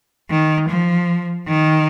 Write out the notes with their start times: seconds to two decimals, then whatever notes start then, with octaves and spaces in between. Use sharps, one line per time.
0.30 D#3
0.69 F3
1.48 D#3